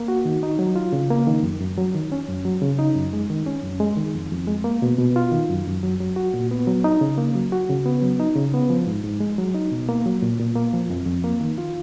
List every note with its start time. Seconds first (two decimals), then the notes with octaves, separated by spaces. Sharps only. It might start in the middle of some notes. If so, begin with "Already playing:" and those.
Already playing: A#3
0.08 F#4
0.25 D#3
0.43 D#4
0.59 F#3
0.76 F4
0.93 C#3
1.11 A#3
1.27 D#3
1.43 F#2
1.60 F#2
1.77 F#3
1.94 D#3
2.12 C#4
2.29 F#2
2.45 F#3
2.62 C#3
2.79 D#4
2.95 F#2
3.13 G#3
3.30 D#3
3.47 C#4
3.63 F#2
3.80 G#3
3.97 D#3
4.15 F2
4.31 F2
4.47 G#3
4.64 A#3
4.82 B2
4.98 B2
5.16 F4
5.32 D#3
5.50 F#2
5.67 F#2
5.83 F#3
6.00 F#3
6.16 F#4
6.34 A#2
6.51 B3
6.67 F#3
6.84 D#4
7.01 C#3
7.18 A#3
7.35 F#3
7.52 F#4
7.69 C#3
7.86 B3
8.02 F#3
8.20 D#4
8.36 C#3
8.54 B3
8.70 F3
8.87 G#2
9.04 G#2
9.20 G#3
9.38 F#3
9.54 D#4
9.72 B2
9.89 A#3
10.06 F#3
10.22 A#2
10.40 A#2
10.56 A#3
10.73 F3
10.90 F2
11.07 F2
11.24 A#3
11.41 D#3
11.58 F4